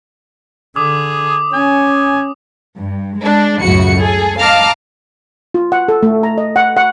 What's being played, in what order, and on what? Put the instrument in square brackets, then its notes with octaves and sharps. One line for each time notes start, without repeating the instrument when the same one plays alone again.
[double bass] D3 [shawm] G#4 [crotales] D6 D#6
[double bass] C#4 [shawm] G#5
[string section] G2
G#3 D4
C#2 F#2 A2 C#3 F#4 C#7
G#4 A4
D#5 F5 A5 A#5 D6 F6
[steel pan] F4
F#5
A4
A3
A#5
D#5
F#5
F#5